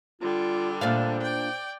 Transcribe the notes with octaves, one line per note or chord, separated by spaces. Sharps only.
D3 G3 F4
A#2 D4 C5 F5
D5 G5